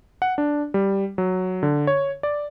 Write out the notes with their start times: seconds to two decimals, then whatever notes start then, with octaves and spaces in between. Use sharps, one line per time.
0.22 F#5
0.38 D4
0.74 G3
1.18 F#3
1.63 D3
1.87 C#5
2.23 D5